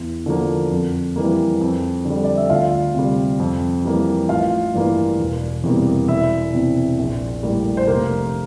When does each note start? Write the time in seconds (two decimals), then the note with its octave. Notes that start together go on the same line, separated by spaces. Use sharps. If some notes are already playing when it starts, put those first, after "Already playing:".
Already playing: E2
0.26 D3 F3 A#3
0.71 F2
1.16 E3 G3 A#3
1.61 F2
2.05 D3 G3
2.25 D5
2.37 E5
2.50 D2 F4 F5
2.94 C3 G3
3.40 F2
3.85 E3 G3 A#3
4.29 A1 F4 F5
4.74 G2 E3 A#3
5.19 E1
5.63 E2 C3 G3 A#3
6.08 E1 E4 E5
6.53 E2 C3
6.98 A#1
7.42 A2 G3 A#3
7.77 C5
7.87 F1 A#3 A#4